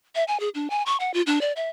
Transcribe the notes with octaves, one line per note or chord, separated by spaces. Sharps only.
E5
G#5
G#4
D4
G#5
C#6
F#5
F4
D4
D5
E5